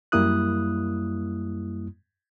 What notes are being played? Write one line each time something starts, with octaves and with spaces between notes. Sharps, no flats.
F#2 G3 A#3 E4 D#6 F#6